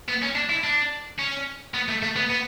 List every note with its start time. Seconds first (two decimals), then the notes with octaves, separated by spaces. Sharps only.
0.09 B3
0.23 C#4
0.36 D4
0.50 E4
0.64 D4
1.19 C#4
1.74 B3
1.89 A3
2.02 A3
2.16 B3
2.30 B3